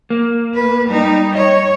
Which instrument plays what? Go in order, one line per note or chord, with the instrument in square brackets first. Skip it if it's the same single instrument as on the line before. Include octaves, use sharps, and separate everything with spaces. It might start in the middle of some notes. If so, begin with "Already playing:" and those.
[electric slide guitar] A#3
[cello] B4
G3 D#4
[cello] C#5 [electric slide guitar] D#5